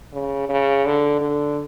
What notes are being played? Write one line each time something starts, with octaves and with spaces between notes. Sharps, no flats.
C#3
C#3
D3
D3